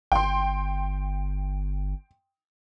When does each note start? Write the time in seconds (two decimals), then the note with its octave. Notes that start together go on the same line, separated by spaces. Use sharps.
0.12 G1 G5 C6